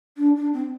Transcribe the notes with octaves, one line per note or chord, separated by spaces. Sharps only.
D4
D4
C4